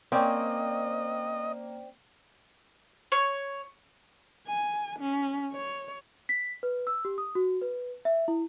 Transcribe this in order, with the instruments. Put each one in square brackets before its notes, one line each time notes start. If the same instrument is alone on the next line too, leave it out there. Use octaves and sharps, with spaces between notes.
[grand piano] A#3 [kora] C4 C#4 [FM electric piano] C5 D5 G5 [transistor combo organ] D#5
[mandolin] C#5
[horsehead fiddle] G#5
C#4
C#5
[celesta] B6
B4
E6
G4
D#6
F#4
B4
E5
E4